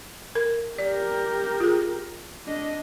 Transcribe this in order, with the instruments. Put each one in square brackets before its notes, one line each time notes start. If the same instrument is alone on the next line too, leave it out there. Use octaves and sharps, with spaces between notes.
[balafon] A#4
[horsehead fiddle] G4 A#4 [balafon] D5
[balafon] F4 G#4
[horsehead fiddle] D4 D#5